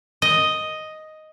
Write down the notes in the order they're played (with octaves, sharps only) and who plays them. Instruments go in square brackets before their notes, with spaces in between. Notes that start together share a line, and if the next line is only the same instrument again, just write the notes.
[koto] D#5